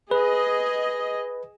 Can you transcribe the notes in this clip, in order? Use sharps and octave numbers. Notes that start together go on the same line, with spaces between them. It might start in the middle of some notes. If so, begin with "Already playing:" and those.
G#4 B4 D#5